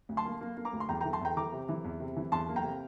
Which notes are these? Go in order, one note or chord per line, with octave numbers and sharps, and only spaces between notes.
D2
A5 C6
A#3
A#3
A#3
A#5 D6
D2
C6
E2 G5 A#5
G5 A#5
E3
A5 C6
E2 G5 A#5
E3 A#5 D6
C3
E3
E2
C3
E3
E2 A5 C6
A#3
G5 A#5
C3